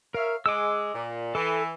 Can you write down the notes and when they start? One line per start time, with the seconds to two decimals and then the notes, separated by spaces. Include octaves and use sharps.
0.14 A#4 C#5 E5 F5
0.46 G#3 D6 E6
0.93 A#2
1.35 E3 A4